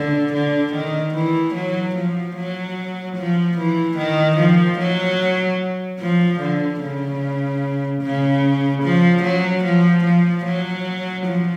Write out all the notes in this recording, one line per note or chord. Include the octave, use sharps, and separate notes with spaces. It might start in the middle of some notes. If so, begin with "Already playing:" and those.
Already playing: D3
D3
D#3
E3
F#3
F3
F#3
F3
E3
D#3
F3
F#3
F3
D3
C#3
C#3
F3
F#3
F3
F3
F#3
F3